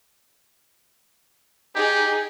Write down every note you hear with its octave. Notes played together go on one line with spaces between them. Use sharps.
D#4 G4 G#4